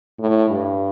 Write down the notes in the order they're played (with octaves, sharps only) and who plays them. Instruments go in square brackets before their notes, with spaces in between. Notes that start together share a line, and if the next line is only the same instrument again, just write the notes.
[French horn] A2
G2